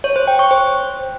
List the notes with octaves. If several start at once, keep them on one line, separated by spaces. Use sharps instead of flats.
C#5
C5
G5
C#6
C5